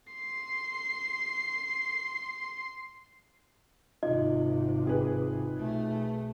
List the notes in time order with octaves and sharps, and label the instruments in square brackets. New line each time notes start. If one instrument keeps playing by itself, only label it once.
[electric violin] C6 C7
[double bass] G#1 C3 [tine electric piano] D#4 F4 [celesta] D#5
[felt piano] C4 G#4 B4
[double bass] B1 A3